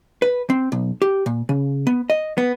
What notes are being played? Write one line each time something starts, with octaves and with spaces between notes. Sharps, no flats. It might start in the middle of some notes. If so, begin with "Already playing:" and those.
B4
C4
B1
G4
A#2
C#3
B3
D#5
B3